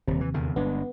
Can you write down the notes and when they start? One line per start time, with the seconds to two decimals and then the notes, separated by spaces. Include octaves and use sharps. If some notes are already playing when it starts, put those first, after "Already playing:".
0.08 D#1 D#2 C3
0.21 E3
0.34 E2 D3 D#3
0.56 G1 G#3 B3 D4